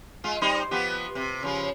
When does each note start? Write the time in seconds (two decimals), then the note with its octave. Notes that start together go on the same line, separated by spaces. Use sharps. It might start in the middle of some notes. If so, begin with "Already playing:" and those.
0.24 G#3 F4
0.41 G3 D#4 C5
0.71 F3 B3 G4
1.15 C3
1.43 C#3 F3